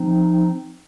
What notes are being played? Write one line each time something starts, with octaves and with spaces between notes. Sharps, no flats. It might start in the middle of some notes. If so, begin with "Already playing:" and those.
Already playing: F3 C4 D#4